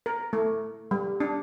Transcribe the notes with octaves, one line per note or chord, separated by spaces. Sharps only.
A#4
A3
G3
D4